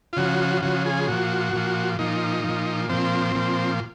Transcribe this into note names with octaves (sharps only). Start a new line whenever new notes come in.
F4
C#3 F3 F#4
C#3 F3 F#4
G#4
A#2 F3 F#4
A#2 F3
A#2 F3 D#4
A#2 F3
A#2 F3 C4
A#2 F3